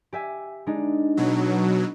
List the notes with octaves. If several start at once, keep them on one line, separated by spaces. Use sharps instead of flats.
G4 E5 G#5
G#3 D4 D#4
B2 F#3